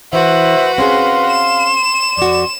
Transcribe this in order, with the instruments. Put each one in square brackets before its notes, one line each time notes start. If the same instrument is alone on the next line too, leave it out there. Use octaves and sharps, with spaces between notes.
[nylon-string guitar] E3 [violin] F#4 B4 [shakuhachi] C5 [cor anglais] E5
[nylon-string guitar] C4 C#4 G#4 [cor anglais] F5 [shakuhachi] C6
[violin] E7
[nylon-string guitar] F2 F#4 [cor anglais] D5